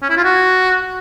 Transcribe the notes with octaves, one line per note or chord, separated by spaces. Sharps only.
C#4
E4
F4
F#4